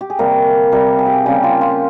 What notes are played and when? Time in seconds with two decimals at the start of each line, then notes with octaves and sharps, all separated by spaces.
0.01 G4
0.10 G#4
0.19 C3 G3 A#3 A#4
0.72 C3 G3 A#3 A#4
0.99 G#4
1.06 G4
1.13 G#4
1.26 C#3 G3 A#3 G4
1.43 F4
1.61 F4